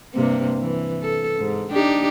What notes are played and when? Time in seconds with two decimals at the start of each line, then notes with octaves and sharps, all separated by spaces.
0.14 G2 C3 A#3
0.59 E3
1.02 A4
1.39 G#2
1.71 D4 D#4 G4